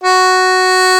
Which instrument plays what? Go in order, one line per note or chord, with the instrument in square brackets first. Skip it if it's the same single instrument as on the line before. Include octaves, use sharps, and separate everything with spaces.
[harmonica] F#4